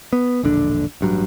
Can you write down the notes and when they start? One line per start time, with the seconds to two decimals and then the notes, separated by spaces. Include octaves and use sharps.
0.13 B3
0.43 E1 A#1 D3 D4
1.01 A1 G2 F#3